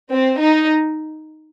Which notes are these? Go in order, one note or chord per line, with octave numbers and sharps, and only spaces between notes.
C4
D#4